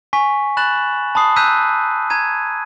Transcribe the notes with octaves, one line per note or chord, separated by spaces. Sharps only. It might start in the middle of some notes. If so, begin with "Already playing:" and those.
G#5 C#6 B6
B5 F#6 A6 E7 F#7
A5 B5 D#6 C7
A#5 E6 F#6 G6 B6 D#7
A#5 G#6 D#7